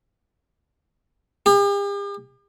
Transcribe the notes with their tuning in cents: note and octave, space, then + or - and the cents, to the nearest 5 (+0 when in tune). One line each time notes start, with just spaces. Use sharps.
G4 +45